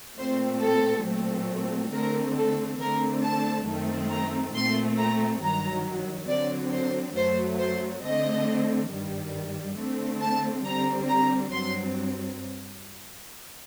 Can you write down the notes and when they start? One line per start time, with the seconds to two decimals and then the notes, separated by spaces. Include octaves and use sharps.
0.18 A#2 A3 C4 C5
0.62 A4
1.05 A#2 F#3 A3 C4
1.93 D3 A3 C4 A#4
2.36 A4
2.80 D3 A3 C4 A#4
3.23 A5
3.67 F#2 D#3 A3 C4
4.11 A#5
4.54 A#2 A3 C4 C6
4.98 A#5
5.42 G2 D#3 F#3 A#5
6.29 D3 F#3 C4 D5
6.72 C5
7.16 F#2 F#3 A3 C5
7.59 C5
8.03 D3 A3 C4 D#5
8.90 G2 D#3 G3
9.77 D3 A3 C4
10.21 A5
10.64 D3 G3 C4 A#5
11.08 A#5
11.52 G2 F#3 C4 C6